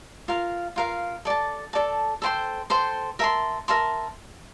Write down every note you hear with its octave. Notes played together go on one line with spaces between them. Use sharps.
F4 A#4 F5
F4 A#4 F5
A4 D5 A5
A4 D5 A5
A4 C5 G5 C6
A4 C5 G5 C6
A#4 E5 A5 C6
A#4 E5 A5 C6